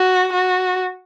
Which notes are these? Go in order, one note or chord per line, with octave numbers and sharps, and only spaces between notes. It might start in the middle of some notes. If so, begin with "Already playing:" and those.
Already playing: F#4
F#4